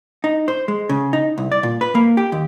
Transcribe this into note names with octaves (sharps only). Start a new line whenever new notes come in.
D#4
C5
G#3
C#3
D#4
C2
D5
A#2
B4
A#3
G4
D#2